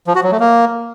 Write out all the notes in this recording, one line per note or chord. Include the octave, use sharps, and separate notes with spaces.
F3
F#4
F#3
A3
A#3